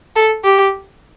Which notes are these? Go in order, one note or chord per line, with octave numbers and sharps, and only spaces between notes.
A4
G4